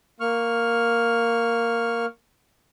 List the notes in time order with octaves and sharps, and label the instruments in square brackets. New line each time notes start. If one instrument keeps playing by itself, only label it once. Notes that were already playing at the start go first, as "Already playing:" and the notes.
[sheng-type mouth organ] A#3 C#6 F6